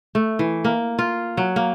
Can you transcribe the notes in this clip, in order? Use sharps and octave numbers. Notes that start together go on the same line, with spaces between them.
A3
E3
A#3
F4
F#3
A#3